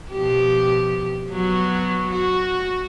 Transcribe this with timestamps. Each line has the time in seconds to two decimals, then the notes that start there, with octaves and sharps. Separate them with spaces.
0.12 B2 F3 G4
1.31 F#3 B3 F#4
2.10 F#4